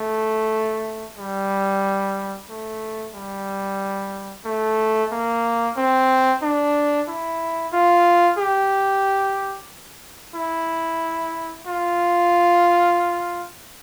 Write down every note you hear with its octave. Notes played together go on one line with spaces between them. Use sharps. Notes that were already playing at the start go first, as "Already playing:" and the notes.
Already playing: A3
G3
A3
G3
A3
A#3
C4
D4
E4
F4
G4
E4
F4